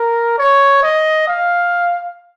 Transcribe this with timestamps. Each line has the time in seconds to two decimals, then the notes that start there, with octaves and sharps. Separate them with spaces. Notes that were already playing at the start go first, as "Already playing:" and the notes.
Already playing: A#4
0.38 C#5
0.83 D#5
1.27 F5